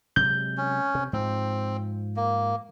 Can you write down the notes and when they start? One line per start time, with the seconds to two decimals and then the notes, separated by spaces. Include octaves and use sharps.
0.16 C3 F#3 G#3 G6
0.57 C#4
0.95 C3
1.13 G#2 F3 C4
2.16 A#3